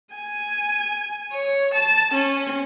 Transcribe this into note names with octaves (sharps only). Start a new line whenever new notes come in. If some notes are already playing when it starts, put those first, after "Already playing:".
G#5
C#5
A5
C#4